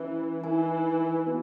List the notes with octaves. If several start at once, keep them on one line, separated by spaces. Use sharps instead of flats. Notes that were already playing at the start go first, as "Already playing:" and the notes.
Already playing: E3 C#4 E4 B4 E5
E3 D#4 A#4 E5 G#5
B3 F#4 B4